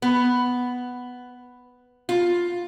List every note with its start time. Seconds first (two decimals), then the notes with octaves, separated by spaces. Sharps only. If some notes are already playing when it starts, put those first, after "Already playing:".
0.02 B3
2.09 F4